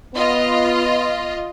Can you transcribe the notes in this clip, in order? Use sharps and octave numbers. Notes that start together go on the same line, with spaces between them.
B3 F4 D#5